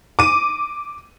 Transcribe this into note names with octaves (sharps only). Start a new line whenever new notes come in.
D6 D#7